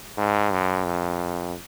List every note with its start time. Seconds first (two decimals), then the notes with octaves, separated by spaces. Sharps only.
0.18 G#2
0.51 F#2
0.84 F2